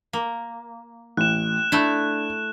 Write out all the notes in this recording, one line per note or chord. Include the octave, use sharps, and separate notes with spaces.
A#3
A1 F#6 E7
A3 D4 E4